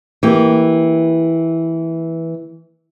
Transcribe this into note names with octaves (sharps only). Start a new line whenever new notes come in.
E3 A#3 G4